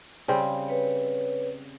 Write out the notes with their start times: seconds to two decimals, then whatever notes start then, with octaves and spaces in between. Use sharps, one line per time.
0.28 C#3 G3 C4
0.68 B4 C#5